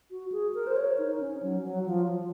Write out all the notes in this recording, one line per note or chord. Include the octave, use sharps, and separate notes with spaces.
F#4
G#4
A#4
C5
C#5
D#4
C#4
F#3
F#3
F3